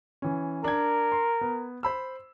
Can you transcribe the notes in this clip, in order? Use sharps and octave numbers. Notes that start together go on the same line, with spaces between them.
E3 C#4
D4 A#4 G#6
C6
B3
C5 B5 E6